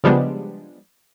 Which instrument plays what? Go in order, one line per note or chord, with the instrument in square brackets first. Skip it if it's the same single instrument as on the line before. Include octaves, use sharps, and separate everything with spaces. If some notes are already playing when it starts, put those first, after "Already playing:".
[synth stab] C#3 F3 G3 G#3 B3 D4